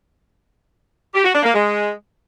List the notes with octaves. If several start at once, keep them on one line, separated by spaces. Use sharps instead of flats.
G4
F#4
D4
A#3
G#3